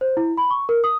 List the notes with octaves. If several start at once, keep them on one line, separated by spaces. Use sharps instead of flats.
C5
E4
B5
C#6
A#4
D#6